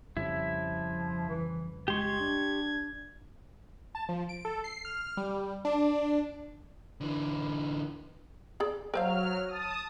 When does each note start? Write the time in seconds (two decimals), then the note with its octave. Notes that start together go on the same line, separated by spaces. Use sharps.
0.17 F2 C#3 F3 G3 E4
1.29 E3
1.88 G#3 G4 C6 C#6 G#6
2.20 D4
3.95 A5
4.09 F3
4.29 D7
4.45 A4
4.64 C7
4.85 F6
5.17 G3
5.65 D4
7.01 D3 E3
8.60 G#4 D5
8.94 F#3 A#4 C5 F5 F6
9.48 A5 D#6